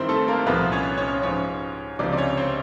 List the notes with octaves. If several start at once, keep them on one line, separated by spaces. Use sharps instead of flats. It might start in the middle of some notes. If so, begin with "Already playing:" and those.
Already playing: G2 D#3 C4 E4 C5
A3 A4
A#3 A#4
C2 A#2 F3 B3 B4
C#4 C#5
C#4 C#5
G#2 F3 C#4 C#5
C#2 C3 F3 D4 D5
D5
C#4 C#5
C4 C5